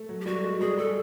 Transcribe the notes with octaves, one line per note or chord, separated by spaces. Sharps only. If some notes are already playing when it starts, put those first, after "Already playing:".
Already playing: A3
F#3
G4
G3 F#4
G#3
G3 G#4
G3 A4